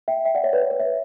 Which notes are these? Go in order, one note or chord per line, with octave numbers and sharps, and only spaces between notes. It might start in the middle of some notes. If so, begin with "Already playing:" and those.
E5 G5
E5 G5
D5 F#5
C#5 E5
B4 D5
C#5
B4
C#5 E5